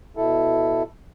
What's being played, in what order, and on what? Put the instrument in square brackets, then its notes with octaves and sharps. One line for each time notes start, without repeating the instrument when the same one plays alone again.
[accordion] B2 E4 A4